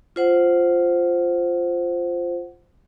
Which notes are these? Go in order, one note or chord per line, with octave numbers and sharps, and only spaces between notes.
F4 C5 F#5